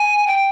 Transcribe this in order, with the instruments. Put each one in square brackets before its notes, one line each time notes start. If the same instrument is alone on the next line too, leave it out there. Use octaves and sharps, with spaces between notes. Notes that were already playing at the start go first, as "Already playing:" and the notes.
Already playing: [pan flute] G#5
G5